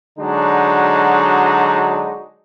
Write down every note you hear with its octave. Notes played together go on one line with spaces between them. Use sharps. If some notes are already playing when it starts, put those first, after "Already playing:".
D3 F#3 G#3 D4 D#4 F#4